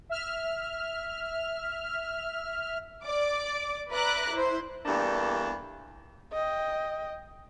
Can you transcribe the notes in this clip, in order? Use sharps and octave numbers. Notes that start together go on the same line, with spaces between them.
E5 F6
D5 D6
B4 D5 E5 A#5 D6 F#6
E4 C5
E2 G2 A3 A#3 D4
D#5 G5